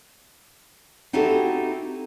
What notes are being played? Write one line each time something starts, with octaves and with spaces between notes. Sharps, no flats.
C4 D#4 E4 F#4 G4 A4